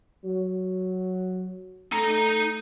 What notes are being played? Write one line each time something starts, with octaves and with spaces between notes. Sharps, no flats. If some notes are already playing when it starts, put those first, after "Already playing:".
F#3
A3 D#4 A#5